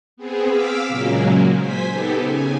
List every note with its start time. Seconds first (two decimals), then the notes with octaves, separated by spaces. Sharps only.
0.17 B3 C4 G#4
0.47 F5 D6 E6 F6 B6
0.88 A#2 C#3 F#3 G#3 A#3
1.57 C5 G#5 B6
1.89 B3 D#4 G4 A4
2.21 C#3 G#5